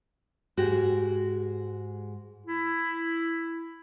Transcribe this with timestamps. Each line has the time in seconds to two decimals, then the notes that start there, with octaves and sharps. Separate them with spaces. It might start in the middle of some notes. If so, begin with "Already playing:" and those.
0.57 G#2 G#3 F#4 G4
2.46 E4